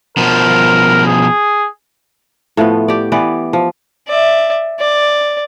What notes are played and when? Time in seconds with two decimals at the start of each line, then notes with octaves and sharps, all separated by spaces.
0.17 B2 F3 A#4
1.06 G#4
2.57 A2 F3 A3 B3
2.88 G4 D5
3.12 E3 B3 B4 D5
3.53 F3
4.08 D5 E5
4.80 D5